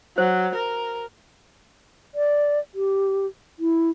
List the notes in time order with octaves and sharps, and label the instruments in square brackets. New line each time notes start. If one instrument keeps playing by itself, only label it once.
[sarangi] F#3 [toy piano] C5
[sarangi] A#4
[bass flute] D5
G4
E4